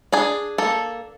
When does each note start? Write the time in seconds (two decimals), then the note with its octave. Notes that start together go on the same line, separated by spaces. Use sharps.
0.12 D4 G#4
0.58 A#3 A4